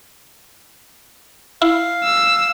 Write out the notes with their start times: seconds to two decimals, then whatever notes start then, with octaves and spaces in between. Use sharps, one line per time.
1.62 E4 F5
2.04 E6